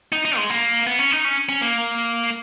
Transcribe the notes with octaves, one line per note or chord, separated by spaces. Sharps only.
D#4
D#4
G#3
A#3
B3
C#4
D#4
C#4
C#4
A#3